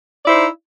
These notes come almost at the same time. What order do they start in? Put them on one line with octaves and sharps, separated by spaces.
D5 E4 C5 D#4